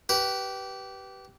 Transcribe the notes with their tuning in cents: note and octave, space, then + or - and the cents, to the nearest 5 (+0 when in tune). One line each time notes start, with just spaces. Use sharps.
G4 -20 B4 -5